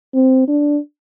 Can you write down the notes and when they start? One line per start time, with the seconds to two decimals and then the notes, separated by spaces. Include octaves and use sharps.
0.14 C4
0.48 D4